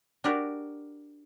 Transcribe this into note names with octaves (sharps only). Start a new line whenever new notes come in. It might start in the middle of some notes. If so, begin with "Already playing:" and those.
D4 F#4 G4 A#4 D5